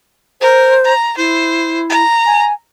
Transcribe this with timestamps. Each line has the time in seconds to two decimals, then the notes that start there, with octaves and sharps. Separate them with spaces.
0.41 A#4 C5
0.85 A#5
1.17 E4 C5
1.90 A#5
2.26 G#5